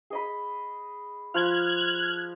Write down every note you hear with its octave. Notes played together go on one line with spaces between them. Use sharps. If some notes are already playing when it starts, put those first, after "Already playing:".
G#4 D#5 B5
F3 F4 F6 F#6 G#6